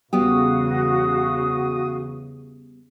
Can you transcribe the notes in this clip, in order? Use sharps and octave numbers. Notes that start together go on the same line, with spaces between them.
E2 C#3 G3 B3 F#4 G4 F5 D#6